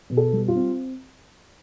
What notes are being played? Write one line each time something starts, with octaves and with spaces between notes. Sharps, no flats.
B2
A4
G3
F4
C4